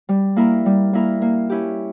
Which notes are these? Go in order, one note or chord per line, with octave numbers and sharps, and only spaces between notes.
G3
A#3 E4 A#4
G3
A#3 E4 A#4
A#3
C#4 E4 G4